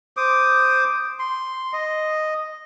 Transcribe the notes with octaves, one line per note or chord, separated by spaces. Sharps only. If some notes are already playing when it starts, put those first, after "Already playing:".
C5 D6 D#6
C6
D#5